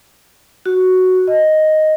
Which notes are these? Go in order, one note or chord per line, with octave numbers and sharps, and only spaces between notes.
F#4
D#5